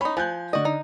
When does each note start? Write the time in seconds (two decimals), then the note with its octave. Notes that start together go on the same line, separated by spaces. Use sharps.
0.01 C#4 D#4 B5
0.17 F3 G#5 F#6 G6
0.53 D3 F#4 D5 D#5
0.65 D#4